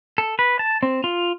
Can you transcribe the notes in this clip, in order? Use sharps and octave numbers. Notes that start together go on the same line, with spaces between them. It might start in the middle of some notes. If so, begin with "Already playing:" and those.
A4
B4
A5
C4
F4